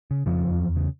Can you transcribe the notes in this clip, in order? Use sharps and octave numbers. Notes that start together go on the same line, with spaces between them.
C#3
F2 C#3 F3
E2
E2
C#3